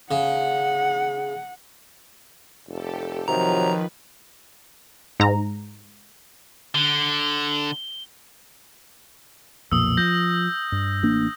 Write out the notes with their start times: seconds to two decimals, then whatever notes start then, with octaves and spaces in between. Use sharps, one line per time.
0.11 C#3 F#5
2.68 F1 G4 A4
3.28 C3 D#3 F3 F#3 B4 A#5
5.20 G#2 A#5
6.75 D3 G7
9.72 B1 F2 A#2 D#6 E6
9.97 F3 G6 A#6
10.72 G2
11.03 A1 A#3 D4